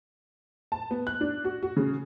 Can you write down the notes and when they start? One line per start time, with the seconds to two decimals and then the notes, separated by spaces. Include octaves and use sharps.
0.72 A5
0.91 B3
1.07 F#6
1.21 D4
1.45 F#4
1.63 F#4
1.76 C#3